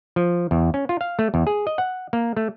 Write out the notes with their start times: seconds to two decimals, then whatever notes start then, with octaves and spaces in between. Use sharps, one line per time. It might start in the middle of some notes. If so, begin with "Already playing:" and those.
0.16 F3
0.51 E2
0.74 C#4
0.89 F4
1.01 F5
1.19 A3
1.34 E2
1.47 G#4
1.67 D#5
1.78 F#5
2.13 A#3
2.37 A3